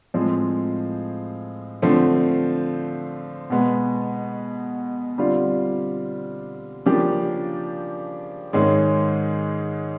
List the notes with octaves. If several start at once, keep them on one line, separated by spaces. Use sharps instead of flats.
A2 F3 G#3 C4
D3 F3 A3 C4
B2 G#3 B3
D3 G3 C4 F4
C#3 F3 A#3 D4 G4
G#2 D#3 G#3 C#4